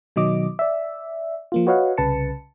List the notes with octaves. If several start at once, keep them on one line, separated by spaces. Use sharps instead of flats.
B2 D#3 F#3 D#5 D6
D5 E5
F3 A#3 F4
F#4 B4 C#5 D#5 F5 F#5
C2 C#3 B4 A5 C#7